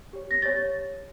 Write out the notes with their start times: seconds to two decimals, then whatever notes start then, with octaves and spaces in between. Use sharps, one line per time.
0.13 G4 C#5
0.31 A#6
0.42 G4 C#5 A6